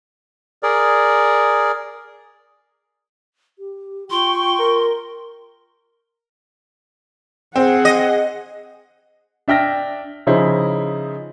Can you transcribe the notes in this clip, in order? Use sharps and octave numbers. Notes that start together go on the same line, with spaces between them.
G#4 A#4 D5
G4
F4 G5 C6 C#6
A#4
C4 G#4 F#5
D#5
D4 E5 G5 F6 A#6
C#3 F3 D#4 E4 G#4 C5